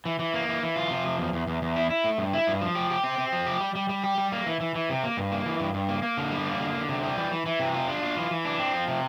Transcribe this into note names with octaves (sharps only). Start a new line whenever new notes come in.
E3
E3
A#3
E3
E3
F4
C3
F3
E2
E2
E2
E2
E4
E4
A3
G2
E4
G2
F3
G4
G4
C4
C4
F3
G4
G3
G3
G3
G4
G3
A#3
E3
E3
E3
C3
A#3
G2
A#3
E3
G2
G2
A#3
A#3
D3
G3
A#3
D3
D3
C3
G3
E3
E3
E3
C3
F4
D4
F4
E3
E3
D4
C4
F3
C3